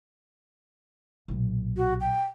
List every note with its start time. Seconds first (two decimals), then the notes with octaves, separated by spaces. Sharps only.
1.28 B1 A#2
1.77 F#4
2.01 G5